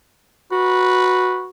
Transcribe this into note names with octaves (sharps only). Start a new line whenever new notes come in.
F#4 B4